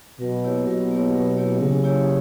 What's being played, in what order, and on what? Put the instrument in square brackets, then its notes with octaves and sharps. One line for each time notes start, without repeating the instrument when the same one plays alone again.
[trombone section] B2 [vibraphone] F#3
[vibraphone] A#3 E4 G4 C#5
[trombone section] B2 [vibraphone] F#3
[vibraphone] A#3 E4 G4 C#5
F#3
A#3 E4 G4 C#5
[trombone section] C#3 [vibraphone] F#3
[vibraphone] A#3 E4 G4 C#5